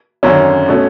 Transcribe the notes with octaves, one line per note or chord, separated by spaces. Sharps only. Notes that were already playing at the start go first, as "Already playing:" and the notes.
G#1 F#2 D3 C#4 C#5
B2 A3 C#4